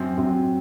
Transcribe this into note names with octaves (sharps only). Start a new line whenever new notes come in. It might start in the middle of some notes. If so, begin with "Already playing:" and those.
Already playing: F#2 F#3 C4
F#2 F#3 C4